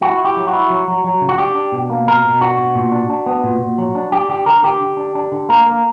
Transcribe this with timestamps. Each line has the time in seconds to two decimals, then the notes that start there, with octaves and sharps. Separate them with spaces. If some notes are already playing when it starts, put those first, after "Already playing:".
0.01 E4 F#4
0.18 E4
0.25 G4
0.37 F#3
0.47 F#4
0.53 E4
0.70 F#3
0.88 F#3
1.04 F#3
1.21 C#3
1.29 F#4
1.38 D4 G4
1.55 D4
1.72 B2
1.90 A#3
2.07 B2 A#4
2.24 B2
2.40 D4 F#4
2.58 B2
2.75 A#2
2.92 D4
3.10 D4
3.26 B3
3.44 A#2
3.60 A#2
3.78 F#3
3.95 D4
4.12 D4 G4
4.29 D3 G4
4.46 D3 A#4
4.63 D3 G4
4.81 D3
4.97 D4
5.15 D4
5.32 D3
5.49 A#3 A#4
5.66 A#3